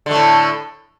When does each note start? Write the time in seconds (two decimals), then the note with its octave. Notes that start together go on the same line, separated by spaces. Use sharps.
0.06 D3
0.11 A3
0.16 A2